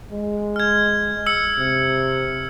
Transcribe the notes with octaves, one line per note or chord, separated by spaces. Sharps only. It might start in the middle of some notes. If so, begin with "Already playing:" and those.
G#3
F6 G#6
E6 C#7
C3